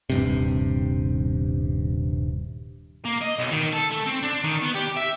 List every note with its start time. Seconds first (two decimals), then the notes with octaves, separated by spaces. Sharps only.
0.10 D#1 G2 C3
3.05 A#3
3.22 D#5
3.39 B1
3.51 D#3
3.73 A4
3.91 A3
4.06 C4
4.23 D4
4.44 D#3
4.62 B3
4.75 G4
4.97 E5